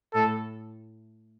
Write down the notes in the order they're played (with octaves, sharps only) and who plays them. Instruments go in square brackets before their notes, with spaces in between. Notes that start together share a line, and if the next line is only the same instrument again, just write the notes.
[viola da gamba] A2 [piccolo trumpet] A4